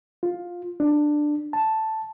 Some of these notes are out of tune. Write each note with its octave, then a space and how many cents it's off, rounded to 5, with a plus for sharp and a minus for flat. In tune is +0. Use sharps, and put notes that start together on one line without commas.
F4 +10
D4 +10
A5 +0